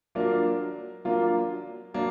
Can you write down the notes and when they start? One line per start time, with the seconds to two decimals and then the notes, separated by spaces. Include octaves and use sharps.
0.15 F#3 A#3 D4 F4 A#4
1.05 F#3 A#3 D4 F4 A#4
1.94 F#3 A#3 D4